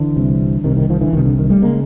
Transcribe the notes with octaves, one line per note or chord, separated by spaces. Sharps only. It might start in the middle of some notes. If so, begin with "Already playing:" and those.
Already playing: D3 E3
C2 C3
C2 C3 D#3
D#3
D#3 F3
D3 E3
C2 C3 D#3
D3
D#3
G3 A3
C#3 G#3 A#3